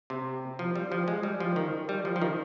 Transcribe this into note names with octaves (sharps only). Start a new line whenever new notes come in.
C3
F3
G3
F3
G#3
G3
F3
D#3
G3
F3
F3
D#3